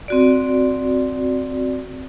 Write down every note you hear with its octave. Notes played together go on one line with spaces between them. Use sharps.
C4 F#4 D5